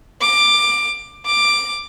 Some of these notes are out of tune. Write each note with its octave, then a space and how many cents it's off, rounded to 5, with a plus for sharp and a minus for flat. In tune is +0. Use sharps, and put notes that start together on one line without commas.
D6 +15
D6 +10